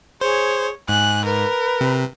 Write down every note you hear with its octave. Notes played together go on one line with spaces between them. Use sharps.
G#4 C5 C#5
G#2 G#5 F#6
A#4 B4
C3